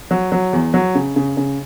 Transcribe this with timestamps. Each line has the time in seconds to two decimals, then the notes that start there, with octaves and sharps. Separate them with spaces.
0.11 F#3
0.32 F#3
0.53 E2
0.74 F#3
0.95 C#3
1.16 C#3
1.37 C#3